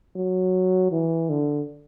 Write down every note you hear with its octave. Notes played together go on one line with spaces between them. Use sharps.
F#3
E3
D3